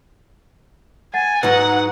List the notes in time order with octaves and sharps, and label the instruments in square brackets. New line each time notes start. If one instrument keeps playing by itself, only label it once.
[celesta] F#5 A6 [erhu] G#5
[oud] G#2 F#3 D#4 [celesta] B4 [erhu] F#5